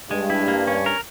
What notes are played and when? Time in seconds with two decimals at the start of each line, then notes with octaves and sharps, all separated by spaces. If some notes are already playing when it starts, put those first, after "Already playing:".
0.10 G2 G#3
0.30 E4
0.48 A#3
0.67 C#4
0.86 A#4